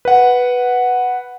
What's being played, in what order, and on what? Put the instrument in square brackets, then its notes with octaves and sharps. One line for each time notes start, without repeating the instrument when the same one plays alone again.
[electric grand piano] B4 F#5